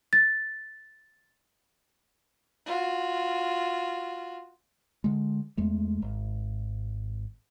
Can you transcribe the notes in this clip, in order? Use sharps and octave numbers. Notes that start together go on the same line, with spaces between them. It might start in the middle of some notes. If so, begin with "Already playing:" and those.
A6
F4 F#4
D3 G#3
E2 G#3 A3
G#1